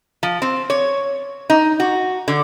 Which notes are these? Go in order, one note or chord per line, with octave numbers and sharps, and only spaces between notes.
F3
C4
C#5
D#4
F#4
D3